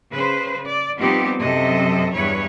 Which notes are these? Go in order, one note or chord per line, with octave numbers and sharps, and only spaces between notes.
C#3 B4 C5
D5
F3 G3 B3 C4 D#4 G4
F#2 C3 F#3 A4 D#5 E5
E2 G2 B4 C#5